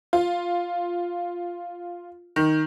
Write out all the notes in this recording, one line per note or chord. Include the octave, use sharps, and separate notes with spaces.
F4
D#3